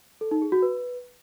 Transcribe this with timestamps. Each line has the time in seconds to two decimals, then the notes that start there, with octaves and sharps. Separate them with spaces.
0.21 A4
0.31 D#4
0.42 G#4
0.52 F#4
0.62 B4